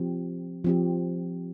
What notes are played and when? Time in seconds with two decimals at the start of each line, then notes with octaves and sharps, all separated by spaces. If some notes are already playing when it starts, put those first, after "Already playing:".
Already playing: F3 C4 G4
0.64 F3 C4 G4